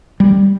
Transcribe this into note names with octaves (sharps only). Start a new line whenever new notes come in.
G3